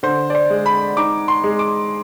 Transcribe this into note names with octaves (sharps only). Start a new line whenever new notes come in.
D3 C5
D5
C5
G#3
B5
D#4 D6
C6
G#3
D6